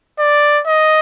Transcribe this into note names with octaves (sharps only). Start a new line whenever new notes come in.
D5
D#5